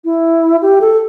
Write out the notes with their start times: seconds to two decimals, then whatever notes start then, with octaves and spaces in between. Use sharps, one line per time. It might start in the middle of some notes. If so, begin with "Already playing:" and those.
0.05 E4
0.62 G4
0.81 A4